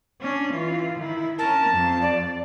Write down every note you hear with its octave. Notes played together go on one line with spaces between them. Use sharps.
C#4 D4
E3 F4
D#3 E4
C#4 A#4 A5
F2
D5